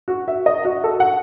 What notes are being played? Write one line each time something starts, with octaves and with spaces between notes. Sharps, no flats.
F#4
E5
D#5
F#4
A4
F#5